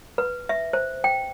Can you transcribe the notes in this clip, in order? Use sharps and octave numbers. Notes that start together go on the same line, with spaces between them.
B4
E5
C5
G5